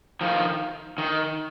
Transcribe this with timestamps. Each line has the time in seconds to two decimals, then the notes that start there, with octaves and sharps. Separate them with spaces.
0.21 D#3 F3
0.98 D#3